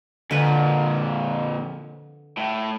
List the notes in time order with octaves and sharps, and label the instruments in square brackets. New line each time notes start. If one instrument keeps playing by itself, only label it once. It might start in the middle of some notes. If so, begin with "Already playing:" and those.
[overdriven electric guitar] F2 A#2 [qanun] D3 B4
[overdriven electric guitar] A2